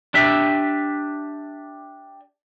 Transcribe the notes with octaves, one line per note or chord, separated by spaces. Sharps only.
D4 G4 E5